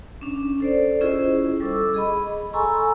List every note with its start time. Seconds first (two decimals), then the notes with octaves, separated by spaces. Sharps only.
0.21 C#4 D4
0.60 A4 C5 D5
1.01 C#4 E4 F4 G#4 C5 D#5
1.60 G3 A4 C#6 D6 E6
1.94 G#4 D#5 B5
2.53 A4 G#5 A#5 C6 C#6 E6